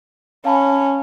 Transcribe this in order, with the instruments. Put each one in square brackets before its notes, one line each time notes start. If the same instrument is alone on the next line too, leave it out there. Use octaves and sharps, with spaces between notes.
[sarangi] C#4 [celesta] F5 A5 B5